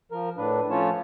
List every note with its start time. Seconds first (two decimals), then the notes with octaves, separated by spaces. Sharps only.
0.12 F3 A#4
0.37 A2 D4 B4
0.70 F3 A3 C#4 F4 C#5 A5